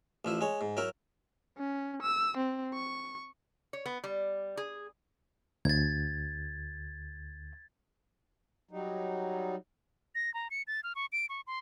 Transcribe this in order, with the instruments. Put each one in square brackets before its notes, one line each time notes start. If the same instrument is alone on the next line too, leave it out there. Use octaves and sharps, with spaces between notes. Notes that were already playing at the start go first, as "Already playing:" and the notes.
[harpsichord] A1 F3 E4
G#3 C#5
G#2
F#3 E4 A#4
[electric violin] C#4
E6
C4
C#6
[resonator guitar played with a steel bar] C#5
B3
G3
G#4
[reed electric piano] D2 [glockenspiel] G#6 A6
[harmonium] F#3 G3 D#4
[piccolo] A#6
A#5
C#7
A6
F6
C#6
D7
C#6
C6